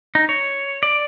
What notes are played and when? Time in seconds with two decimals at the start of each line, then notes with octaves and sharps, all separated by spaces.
0.15 D#4
0.29 C#5
0.83 D5